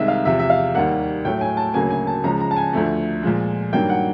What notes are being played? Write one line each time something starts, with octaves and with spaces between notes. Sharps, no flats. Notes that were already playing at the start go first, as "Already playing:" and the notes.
Already playing: C2 C3 D#3 G#3 D#5 E5
F5
E2 C3 F3 E5
E5
F5
D#2 D#3 G3 A#3 F#5
A2 F#3 A3 G5
G#5
A5
D2 C#3 F#3 A#3 G#5
G#5
A5
C#2 C#3 F3 G#3 A#5
A#5
A5
G#5
D2 D3 F3 A3
A#2 F3 G#3
G2 D#3 F#3 A#3 G5
F#5